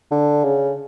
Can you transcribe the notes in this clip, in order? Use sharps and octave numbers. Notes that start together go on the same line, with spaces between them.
D3
C#3